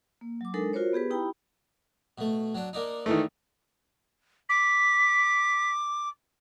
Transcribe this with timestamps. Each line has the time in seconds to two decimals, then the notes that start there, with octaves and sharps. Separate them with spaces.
0.21 A#3
0.41 F#3 D6
0.54 G#3 D4 D#4 A4 A#4
0.73 F4 F#4 A#4 C5 C#5
0.93 B3 G4 G#4 B4
1.10 D#4 E4 G4 G5 A#5 B5
2.18 B2 A3
2.55 F#3 D4
2.73 A#3 D4 D#4
3.06 D#3 E3 A3
4.49 D6 B6